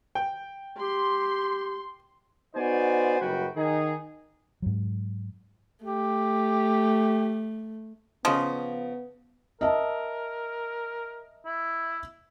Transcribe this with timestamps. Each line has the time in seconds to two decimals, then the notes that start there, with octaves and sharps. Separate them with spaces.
0.15 G5
0.80 G4 C6
2.56 B3 D#4 F#4 C5 D5 G#5
3.20 F#1 F#2 G3 F#4 B4 G5
3.56 D#3 D#4 G#4
4.62 G#2 F#3
5.84 A3 G4
8.25 C#3 F3 B3 D#5
9.61 A#4 D#5 E5 A5
11.45 E4